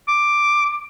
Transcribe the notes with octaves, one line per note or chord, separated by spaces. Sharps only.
D6